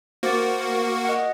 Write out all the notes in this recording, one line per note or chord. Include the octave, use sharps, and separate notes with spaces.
A#3 F#4 C5 D6 A6
C#6
D#5 F#5